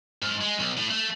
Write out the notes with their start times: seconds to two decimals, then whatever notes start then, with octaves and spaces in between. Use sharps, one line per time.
0.22 G#2
0.41 G#3
0.60 B1
0.77 A2
0.91 A3